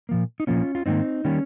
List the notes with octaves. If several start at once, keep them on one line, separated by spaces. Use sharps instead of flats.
A#2 F3 A#3
D#4
A#2 F3 A#3 C#4 F4
F4
G#2 D#3 G3 A#3 C4 D#4
D#3 G3 A#3 C#4